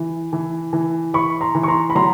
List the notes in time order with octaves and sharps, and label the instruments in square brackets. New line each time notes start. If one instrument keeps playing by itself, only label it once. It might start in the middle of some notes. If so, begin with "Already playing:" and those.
Already playing: [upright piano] E3
E3
E3
E3 B5 C#6
A#5 C6
E3
C#6
A#5 C6
B5
F#3 A#5 C6